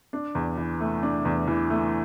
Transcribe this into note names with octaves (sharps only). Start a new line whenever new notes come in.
D4
E2
E3
A3
D4
E2
E3
A3